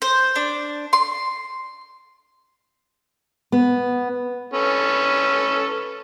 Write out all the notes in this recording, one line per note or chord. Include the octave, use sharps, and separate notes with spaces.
C5
D4
C6
B3
C#4 A4 B4